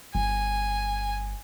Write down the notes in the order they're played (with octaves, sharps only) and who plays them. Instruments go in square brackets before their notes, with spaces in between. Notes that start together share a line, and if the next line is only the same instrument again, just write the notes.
[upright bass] G1 [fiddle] G#5